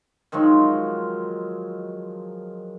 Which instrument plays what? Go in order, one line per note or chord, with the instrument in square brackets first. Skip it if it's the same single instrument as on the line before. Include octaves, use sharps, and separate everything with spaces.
[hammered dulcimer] D#3 F3 F#3 G#3